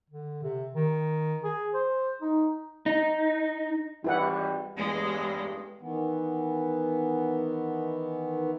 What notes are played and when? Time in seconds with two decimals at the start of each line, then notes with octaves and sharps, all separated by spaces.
0.10 D3
0.43 C3
0.75 D#3
1.44 G#4
1.74 C5
2.21 D#4
2.86 D#4
4.04 G#1 E3 G3 E4 B4 F#5
4.77 A1 E2 G2 G#3
5.81 D#3 E3 B3